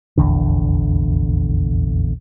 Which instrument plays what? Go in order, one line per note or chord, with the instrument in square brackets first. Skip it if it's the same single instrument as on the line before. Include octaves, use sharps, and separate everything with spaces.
[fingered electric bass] F1 A#1 E2 D3